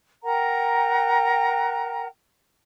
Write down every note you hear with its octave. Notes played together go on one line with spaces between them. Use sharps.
A#4 F#5 G5 A#5